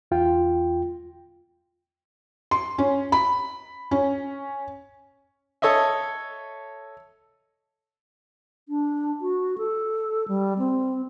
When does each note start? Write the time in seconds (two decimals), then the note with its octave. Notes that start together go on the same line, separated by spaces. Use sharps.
0.11 E2 F4 G5
2.51 C6
2.78 C#4
3.12 B5
3.91 C#4
5.62 A4 C#5 D#5 E5
8.69 D4
9.21 F#4
9.58 A4
10.28 G3
10.58 C4